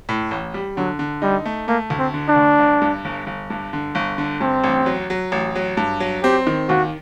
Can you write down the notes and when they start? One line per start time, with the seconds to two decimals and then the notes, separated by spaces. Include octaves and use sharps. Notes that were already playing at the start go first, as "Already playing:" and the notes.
0.09 A2
0.31 A1
0.54 G3
0.77 D3 F#3
0.99 D3
1.22 G3 D#4
1.46 A3
1.68 A3 A#3
1.90 D2
1.98 C4
2.14 D3
2.28 D4
2.36 D2
2.59 G1
2.82 G2
3.05 G1
3.27 G1
3.50 G2
3.73 D3
3.95 G1
4.18 D3
4.41 G2 C4
4.64 A1
4.86 F#3
5.10 F#3
5.32 A1
5.56 F#3
5.77 G2
6.00 F#3
6.23 C4 G4
6.47 D#3
6.69 D#2 F#4